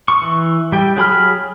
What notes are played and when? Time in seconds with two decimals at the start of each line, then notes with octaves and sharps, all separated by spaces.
0.08 C#6
0.22 E3
0.72 G3 G5
0.96 F#3 G#4 B5 F6